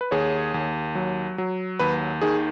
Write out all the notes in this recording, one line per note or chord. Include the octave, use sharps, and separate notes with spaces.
B4
D#2 G#4 C#5
D#2
F#3
F#3
D#2 B4
D#3 G#4